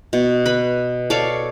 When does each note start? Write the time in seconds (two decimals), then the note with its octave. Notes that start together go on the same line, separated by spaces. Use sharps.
0.13 B2
0.46 B4 B5
1.10 A4 C#5 D5 F5